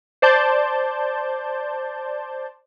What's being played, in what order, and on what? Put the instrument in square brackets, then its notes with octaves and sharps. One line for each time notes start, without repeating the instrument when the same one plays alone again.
[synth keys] C5 D5 A5 G6